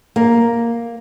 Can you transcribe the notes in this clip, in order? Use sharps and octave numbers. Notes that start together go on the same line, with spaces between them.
A#3